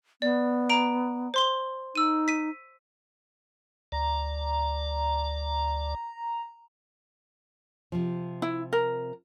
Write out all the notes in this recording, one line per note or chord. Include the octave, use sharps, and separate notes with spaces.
B3 D5
A#5 D7
C5 C6 G7
D#4 E6 D#7
B6 D#7
D2 D5 A#5
C3 F3
E4
A#4